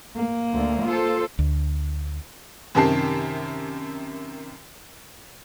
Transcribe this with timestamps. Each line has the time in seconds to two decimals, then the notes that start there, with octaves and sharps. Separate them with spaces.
0.16 A#3
0.54 D2
0.86 F4 A4 C5
1.39 D2
2.75 F#2 C3 D#3 G4 A5 C7